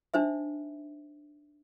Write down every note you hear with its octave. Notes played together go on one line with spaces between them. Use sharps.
D4 D#4 C5 E5